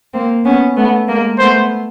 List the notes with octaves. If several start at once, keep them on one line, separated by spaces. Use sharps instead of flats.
A#3 C4
B3 C#4
A3 B3
G#3 A#3
A3 B3 C5